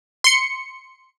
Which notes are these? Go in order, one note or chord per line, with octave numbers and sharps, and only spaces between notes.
C6 C#7